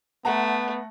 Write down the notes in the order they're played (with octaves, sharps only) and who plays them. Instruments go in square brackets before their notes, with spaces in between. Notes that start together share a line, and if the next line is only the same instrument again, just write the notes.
[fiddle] A3 [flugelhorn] B3 [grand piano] F#5 A#5